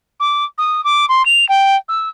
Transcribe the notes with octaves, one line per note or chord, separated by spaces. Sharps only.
D6
D#6
D6
C6
F7
G5
E6